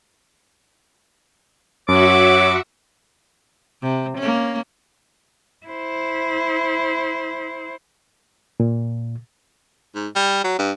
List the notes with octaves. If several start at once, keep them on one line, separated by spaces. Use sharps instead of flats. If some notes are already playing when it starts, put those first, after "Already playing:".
F#2 F#4 C#5 E5 F#5 D6
C3
A#3 C#4
E4 C5
A#2
G#2
G3
F#3
G2